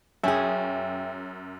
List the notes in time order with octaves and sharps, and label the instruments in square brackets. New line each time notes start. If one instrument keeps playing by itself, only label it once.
[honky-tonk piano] F#2 [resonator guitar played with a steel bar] C#4 G#4 [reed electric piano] E5 G5